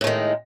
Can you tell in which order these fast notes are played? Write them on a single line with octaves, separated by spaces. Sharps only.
A2 G#3 D#3